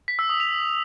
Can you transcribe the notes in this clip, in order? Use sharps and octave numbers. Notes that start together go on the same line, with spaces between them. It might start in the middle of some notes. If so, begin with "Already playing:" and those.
B6
E6
D#6
F7